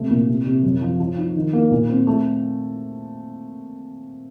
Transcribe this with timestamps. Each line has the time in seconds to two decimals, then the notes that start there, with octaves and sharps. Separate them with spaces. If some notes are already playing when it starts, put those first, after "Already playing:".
Already playing: C3 A3
0.10 A#2
0.28 C3
0.46 C3
0.63 F#2
0.81 F3
1.00 F3
1.17 D#4
1.36 D#3
1.53 A#3
1.71 A#2
1.89 C4
2.07 A3